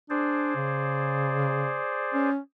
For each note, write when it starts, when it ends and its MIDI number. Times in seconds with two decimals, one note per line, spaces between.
0.10 0.53 62
0.10 2.30 68
0.10 2.30 72
0.10 2.30 74
0.56 1.78 49
2.14 2.37 61